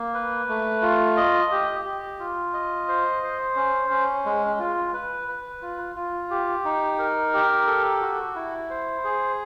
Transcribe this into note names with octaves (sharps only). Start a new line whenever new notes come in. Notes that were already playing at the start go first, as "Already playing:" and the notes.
Already playing: A#3
B4
A3
F4
D#5
G4
G4
F4
D#5
C5
C5
C#4
C#4
G#3
F4
B4
B4
F4
F4
G4
D#4
A#4
G4
A4
F#4
E4
C5
G#4